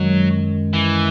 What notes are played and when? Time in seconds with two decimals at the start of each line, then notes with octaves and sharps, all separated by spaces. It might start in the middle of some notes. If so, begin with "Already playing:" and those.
Already playing: F#2 D#3 F#3 G#3
0.73 E3